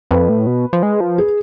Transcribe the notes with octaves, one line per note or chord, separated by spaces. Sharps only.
F2 B4
A2
B2
F3
G#3
F3
G#4